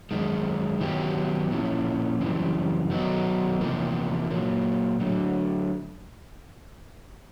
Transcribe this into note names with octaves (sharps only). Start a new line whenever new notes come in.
F#2 D#3 G#3
D#3 F#3 B3 D#4 G4
A#2 F3 A#3 C#4 E4
F#2 C#3 E3 G3 C4
D#3 F#3 B3 D#4
E2 C3 F3 A#3
A#2 F#3 A#3
D3 F#3 A3